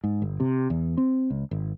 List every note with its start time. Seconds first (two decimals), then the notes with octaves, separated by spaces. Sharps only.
0.04 G#2
0.22 G1
0.40 C3
0.70 E2
0.98 C4
1.30 C#2
1.51 G#1